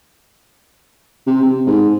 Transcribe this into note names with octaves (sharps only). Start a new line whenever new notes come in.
C3
C3
G#2